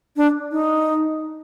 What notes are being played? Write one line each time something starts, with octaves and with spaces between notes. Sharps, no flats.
D4
D#4